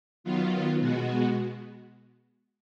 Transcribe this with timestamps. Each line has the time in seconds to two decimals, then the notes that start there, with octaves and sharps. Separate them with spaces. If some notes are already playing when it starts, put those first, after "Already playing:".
0.24 D#3 F#3 B3 F4
0.80 B2 G#3 B3 F#4